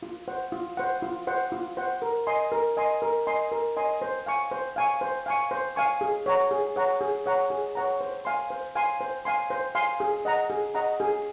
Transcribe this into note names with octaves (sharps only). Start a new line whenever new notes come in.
F4
C5 F#5
F4
C5 F#5
F4
C5 F#5
F4
C5 F#5
A#4
D#5 G#5 C6
A#4
D#5 G#5 C6
A#4
D#5 G#5 C6
A#4
D#5 G#5 C6
C5
F5 G#5 C#6
C5
F5 G#5 C#6
C5
F5 G#5 C#6
C5
F5 G#5 C#6
G#4
C#5 F#5 A#5
G#4
C#5 F#5 A#5
G#4
C#5 F#5 A#5
G#4
C#5 F#5 A#5
C5
F5 G#5 C6
C5
F5 G#5 C6
C5
F5 G#5 C6
C5
F5 G#5 C6
G#4
D#5 F#5 A#5
G#4
D#5 F#5 A#5
G#4